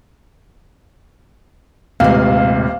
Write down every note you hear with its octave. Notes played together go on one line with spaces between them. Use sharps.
D#1 A1 C3 G#3 F5